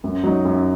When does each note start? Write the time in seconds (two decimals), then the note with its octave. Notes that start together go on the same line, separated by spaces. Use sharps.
0.04 F#2
0.24 F#3 D#4
0.45 F#2